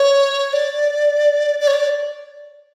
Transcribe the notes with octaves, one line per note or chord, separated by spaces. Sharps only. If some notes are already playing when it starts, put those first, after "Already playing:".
Already playing: C#5
D5
D5
C#5
D5